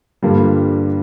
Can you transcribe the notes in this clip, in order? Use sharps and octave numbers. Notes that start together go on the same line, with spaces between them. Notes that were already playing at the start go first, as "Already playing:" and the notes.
G2 D3 G3 A#3 F4